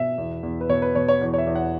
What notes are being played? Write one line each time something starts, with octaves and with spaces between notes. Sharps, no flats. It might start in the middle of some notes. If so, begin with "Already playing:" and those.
Already playing: B2 E5
E2
E2
B4
B2 C#5
B4
B2 C#5
C#5
E2
C#5
E5
E2
F#5